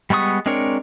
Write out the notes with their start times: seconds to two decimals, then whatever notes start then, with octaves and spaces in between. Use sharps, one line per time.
0.10 G3 G#3 B3 C#6 D#6
0.46 G#3 C4 D4 A#4 C#5